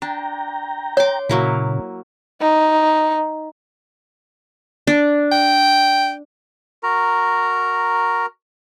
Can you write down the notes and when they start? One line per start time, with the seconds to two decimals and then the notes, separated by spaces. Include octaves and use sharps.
0.02 D4 G5 A#5
0.97 C#5 C6 D6
1.29 A#2 C#3 F#3 A#3 E4
2.41 D#4
4.87 D4
5.32 G5
6.83 F#4 A#4 A#5